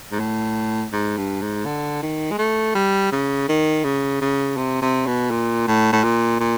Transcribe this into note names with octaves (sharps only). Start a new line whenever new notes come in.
G#2
A2
G#2
G2
G#2
D3
D#3
G#3
A3
G3
C#3
D#3
C#3
C#3
C3
C3
B2
A#2
A2
A2
A#2
A#2